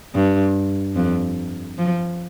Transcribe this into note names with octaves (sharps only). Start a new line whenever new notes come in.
G2
F2
F3